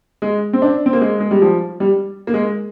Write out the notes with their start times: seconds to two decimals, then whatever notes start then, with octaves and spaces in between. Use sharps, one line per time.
0.22 G#3
0.53 C4
0.62 D4
0.86 C4
0.93 A#3
1.01 G#3
1.20 G#3
1.31 G3
1.42 F3
1.80 G3
2.27 A#3
2.34 G#3